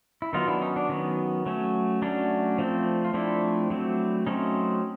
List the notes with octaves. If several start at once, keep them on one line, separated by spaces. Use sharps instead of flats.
E4
D#3 F#3 B3 D#4 F4
D4 E4
C#4 D#4
D4
D#3 F#3 B3 C#4
F#3 A3 C#4
F#3 A3 C#4 D4
F3 A3 C4
F4
F3 A3 C4 D4 E4
F#3 A3 C4
F#3 A3 C4 C#4 D#4